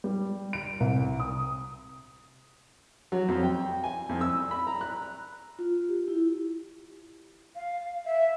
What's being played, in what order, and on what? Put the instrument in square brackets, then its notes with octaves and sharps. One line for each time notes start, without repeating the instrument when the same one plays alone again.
[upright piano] G3
D7
C2
D#6
[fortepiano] F#3
F2
G5
G#5
F2
E6
B5
A#5
F#6
[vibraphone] F4
G4
E4
[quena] F5
E5